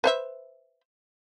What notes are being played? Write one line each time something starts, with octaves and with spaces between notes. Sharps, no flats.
B4 C5 E5